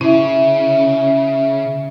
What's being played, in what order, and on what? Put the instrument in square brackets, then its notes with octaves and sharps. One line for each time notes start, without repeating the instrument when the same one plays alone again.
[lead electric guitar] C#3 [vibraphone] C#4 E5 [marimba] E4